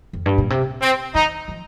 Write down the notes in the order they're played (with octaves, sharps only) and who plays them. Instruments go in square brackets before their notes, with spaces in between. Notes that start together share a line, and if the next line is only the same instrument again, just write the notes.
[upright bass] F2
G2
A#2
C3
[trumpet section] C4
[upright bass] D#3 [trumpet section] D#4
[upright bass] F3